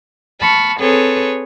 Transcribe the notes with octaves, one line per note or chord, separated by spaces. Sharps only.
A5 B5 C#6 F6
C4 G#4 A4 B4 C#5